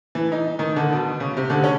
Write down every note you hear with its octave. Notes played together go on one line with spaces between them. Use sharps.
E3
D#4
D#3
D3
B2
C#3
C3
D3
C#4